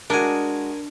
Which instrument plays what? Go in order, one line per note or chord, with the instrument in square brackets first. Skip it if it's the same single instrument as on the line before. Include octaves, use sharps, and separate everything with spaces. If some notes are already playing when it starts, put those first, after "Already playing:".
[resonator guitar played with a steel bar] G#3 F#4 [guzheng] D4 [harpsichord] A#4 G#5